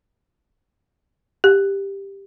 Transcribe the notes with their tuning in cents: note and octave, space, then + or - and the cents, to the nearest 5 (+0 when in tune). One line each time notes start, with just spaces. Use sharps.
G4 +10